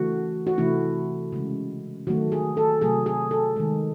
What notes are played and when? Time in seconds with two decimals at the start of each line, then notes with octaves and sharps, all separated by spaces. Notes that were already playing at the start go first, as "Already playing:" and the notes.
Already playing: C#3 E3 A3 F#4
0.47 F#4
0.58 C3 E3 A3 E4
1.33 C#3 G#3
2.07 D#3 F#3 A3 F#4
2.32 G#4
2.57 A4
2.81 C3 F#3 A3 G#4
3.06 G#4
3.31 A4
3.56 D#3 G#3